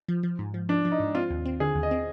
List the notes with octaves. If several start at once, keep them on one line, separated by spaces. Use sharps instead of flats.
F3
F3
G#2
F3
F3 D4
F3
D#4
G#2
C4 F4
D#2
C4
D3 G#4
D#2
D#5
C4